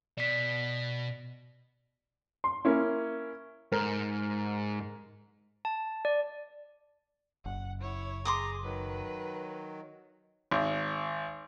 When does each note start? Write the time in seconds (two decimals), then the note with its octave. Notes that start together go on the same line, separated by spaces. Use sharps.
0.17 B2 D5 B6
2.44 C6
2.65 A#3 C#4 E4
3.72 G#2 A#4
5.65 A5
6.05 D5
7.45 F#1 F#5
7.80 E4 C#5
8.25 G#4 A#5 C6 D6 D#6
8.63 D#3 F#3 B4
10.51 G#1